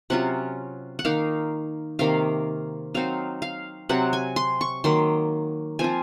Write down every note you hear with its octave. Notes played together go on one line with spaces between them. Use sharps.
C3 F#3 C#4 F4 F#5
F#5
D#3 A#3 D#4 F5
C3 D#3 A#3 F5
F#3 C4 D#4 F5
F5
C3 F#3 C4 F#5
G#5
C6
C#6
D#3 F#3 A#3 C6
F3 C4 F4 G#5